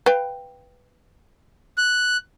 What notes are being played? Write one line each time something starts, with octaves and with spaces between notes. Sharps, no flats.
B4 F5 G5
F#6